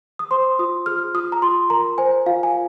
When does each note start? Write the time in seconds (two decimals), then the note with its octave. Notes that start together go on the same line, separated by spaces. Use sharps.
0.19 D#6
0.31 C5 C6
0.59 F4 D#6
0.86 G#4 F6
1.14 F4 D#6
1.32 A#5
1.42 F4 C6
1.70 A#4 A#5
1.98 C5 G#5
2.26 F4 F5
2.43 G#5